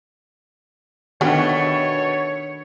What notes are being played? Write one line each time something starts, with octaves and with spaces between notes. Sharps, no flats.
B2 D#3 A3 B3 D4 F#4 G4 C#5